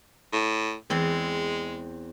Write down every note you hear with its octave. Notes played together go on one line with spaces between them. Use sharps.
A2
E2 G#3 C4 C6